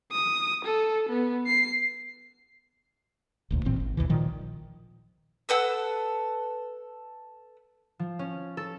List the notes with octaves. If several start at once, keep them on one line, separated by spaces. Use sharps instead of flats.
D#6
A4
B3
C7
F1 D2 A#2
A1 A#2 E3 C4
G#1
A#1 D#2 C3 E3
A#2 D#3 F3
A4 B4 F#5 E6
F3
C#4
A4